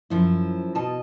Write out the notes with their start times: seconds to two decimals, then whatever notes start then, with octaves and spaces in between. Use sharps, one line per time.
0.10 F#2 F3 E4
0.75 B2 D#5 A5